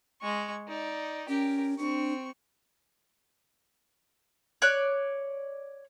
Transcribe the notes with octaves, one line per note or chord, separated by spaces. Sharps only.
G#3 C#6
D#4 D5
C#4 G4 A#4
C4 D4 C#6
C#5 D5 F#6